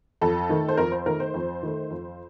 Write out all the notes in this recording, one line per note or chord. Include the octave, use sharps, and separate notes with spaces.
F2 A4
D#3 A3
C5
F2 A#4
C5
D#3 A3 A#4
C5
F2
D#3 A3
F2